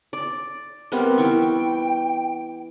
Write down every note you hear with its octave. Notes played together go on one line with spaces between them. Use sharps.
D5
G3 B3 C4 A#4
E3 G5 C#6